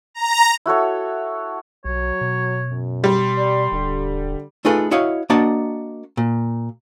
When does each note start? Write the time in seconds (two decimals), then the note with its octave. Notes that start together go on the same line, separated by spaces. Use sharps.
0.14 A#5
0.66 E4 F#4 A4 C#5
1.85 B1 F#3 C#5
2.21 B2
2.69 F#2
3.04 G3 C6
3.37 D5
3.72 D#1 D3
4.65 A3 D#4 F4 G#4 A4 B4
4.91 E4 F#4 C#5 D#5 F5
5.30 A#3 D4 F#4 D#5 A5
6.17 A#2